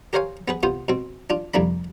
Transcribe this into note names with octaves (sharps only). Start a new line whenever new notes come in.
G4 A#4 C5 C#5 F5 G#5
B3 G#4 B4
C3 B3 F4 C5
B2 C4
D4 F4
C2 F2 A#3 D4 B5